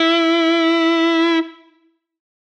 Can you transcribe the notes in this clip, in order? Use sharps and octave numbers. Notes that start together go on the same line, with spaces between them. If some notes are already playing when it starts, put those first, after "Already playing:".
Already playing: E4